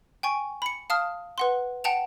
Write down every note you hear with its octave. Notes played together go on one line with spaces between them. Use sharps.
G5 G#5 C#6
B5 C#7
F5 A5 D#6 F6
B4 F#5 C6
F#5 G5 A5 E7 F7